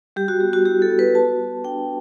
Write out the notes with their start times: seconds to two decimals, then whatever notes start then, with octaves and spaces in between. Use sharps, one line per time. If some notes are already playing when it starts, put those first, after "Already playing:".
0.16 G3 G4
0.28 F#4
0.41 B3 G4
0.53 F#4
0.65 E4 G4
0.82 A4
0.90 B3
0.99 B4
1.14 F#4 A5
1.39 F#4
1.64 D4 G5